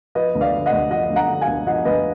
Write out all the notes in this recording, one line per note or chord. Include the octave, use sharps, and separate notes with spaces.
F3 B4 D#5
D2
D5 F5
D3
D#5 F#5
D2
F3 D#5 F#5
D2
F#5 A#5
D3
F5 G#5
D2
F3 D#5 F#5
D2 B4 D#5